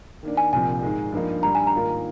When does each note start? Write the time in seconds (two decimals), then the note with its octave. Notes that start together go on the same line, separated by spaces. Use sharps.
0.23 D#3 A#3 D4
0.37 G#5
0.53 C2 A#2 F3 C4 G#5
0.83 G#2 D#3 G#3
1.12 G2 F3 A#3 D#4
1.43 G2 D#3 G3 A#5
1.55 G#5
1.67 A#5
1.73 G#2 D#3 A#3 F4 A#4